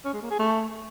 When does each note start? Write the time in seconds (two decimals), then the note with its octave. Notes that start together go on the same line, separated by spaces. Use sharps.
0.05 C#4
0.13 G#3
0.22 A#3
0.30 G#4
0.39 A3